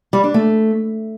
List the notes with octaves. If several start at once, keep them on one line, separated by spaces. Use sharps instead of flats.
G3
D4
A3